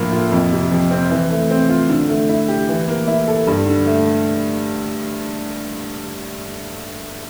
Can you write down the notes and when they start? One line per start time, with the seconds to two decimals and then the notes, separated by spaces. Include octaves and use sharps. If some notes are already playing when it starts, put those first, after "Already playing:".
Already playing: A2 F3 A#3 D4
0.12 F4
0.32 F2
0.52 C3
0.71 F3
0.91 C4
1.11 E3
1.30 A3
1.50 C4
1.69 F4
1.89 D3
2.09 A3
2.29 E4
2.48 G4
2.69 E3
2.88 A#3
3.07 E4
3.28 A4
3.47 G2
3.66 D3
3.86 A3